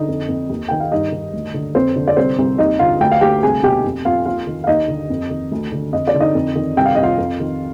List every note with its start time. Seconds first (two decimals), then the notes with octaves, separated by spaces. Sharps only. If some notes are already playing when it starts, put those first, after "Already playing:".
Already playing: D3 D#4 D#5
0.08 F2
0.29 F2
0.49 D#2
0.68 D#3 G5
0.80 F5
0.91 G2 D#4 D#5
1.12 D#3
1.33 D2
1.54 D3
1.75 F2 C4 C5
1.96 D3
2.08 D5
2.17 C2 C4 C5
2.38 C2
2.58 D#2 D#4 D#5
2.79 D3 F4 F5
3.00 D2 G5
3.11 F5
3.21 D2 G4 G5
3.43 C2 G#4 G#5
3.63 B2 G4 G5
3.84 F2
4.05 F2 F4 F5
4.25 D#2 F4 F5
4.47 D#3
4.64 F5
4.67 D#2 D#4 D#5
4.88 D3
5.10 F2
5.30 D#3
5.52 D2
5.72 D3
5.93 F2 D#5
6.07 D5
6.14 D3
6.20 D#4 D#5
6.35 F2
6.55 D#3
6.77 C2 G5
6.86 F5
6.95 C2 D#5
7.03 F4 F5
7.18 F2
7.40 D#3